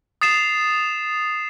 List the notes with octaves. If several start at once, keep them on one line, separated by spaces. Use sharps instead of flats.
D#6 A6 C7 E7